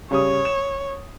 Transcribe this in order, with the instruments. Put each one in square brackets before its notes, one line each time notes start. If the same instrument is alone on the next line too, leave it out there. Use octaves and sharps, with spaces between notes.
[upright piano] C#3 G3 D#6 [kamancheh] C#5
[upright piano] E7